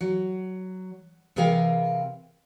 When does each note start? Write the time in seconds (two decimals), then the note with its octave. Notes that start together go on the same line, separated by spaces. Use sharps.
0.01 F#3
1.36 C3 E3 G#4 A#4 F5 G5